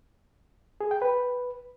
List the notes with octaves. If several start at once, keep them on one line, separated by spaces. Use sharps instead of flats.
G#4
G5
B4